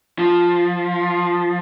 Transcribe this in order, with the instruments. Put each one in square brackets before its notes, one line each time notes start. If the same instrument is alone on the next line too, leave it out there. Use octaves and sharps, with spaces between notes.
[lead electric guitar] F3